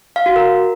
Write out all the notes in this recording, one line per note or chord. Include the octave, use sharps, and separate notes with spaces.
F5
F#4
A#4